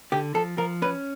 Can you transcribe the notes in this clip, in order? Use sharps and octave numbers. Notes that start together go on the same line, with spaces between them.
D3 G4
F3 A4
F3 A#4
C#4 B4